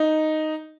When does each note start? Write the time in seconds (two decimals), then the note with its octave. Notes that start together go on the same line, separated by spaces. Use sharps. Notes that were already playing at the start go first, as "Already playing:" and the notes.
Already playing: D#4